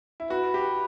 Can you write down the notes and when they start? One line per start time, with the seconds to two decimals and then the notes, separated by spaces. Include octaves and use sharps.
0.20 E4
0.30 F#4 B4
0.54 G4